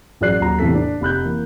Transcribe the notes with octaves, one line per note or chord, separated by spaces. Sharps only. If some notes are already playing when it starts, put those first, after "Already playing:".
A1 F#3 G#4 D5 F#6 C7
D#1 F#3 A#5
E2 A2 C3 E3 A4 B6
D4
F1 B5 F#6 G6
E3 A#3